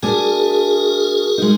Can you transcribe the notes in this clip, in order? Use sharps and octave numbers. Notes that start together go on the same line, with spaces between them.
A3 D4 F#4 G#4 A#4 G#5
G#3 D#4